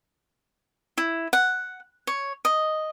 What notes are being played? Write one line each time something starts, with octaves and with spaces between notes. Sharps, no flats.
E4
F#5
C#5
D#5